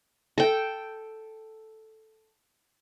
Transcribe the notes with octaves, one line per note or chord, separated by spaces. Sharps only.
A4 G5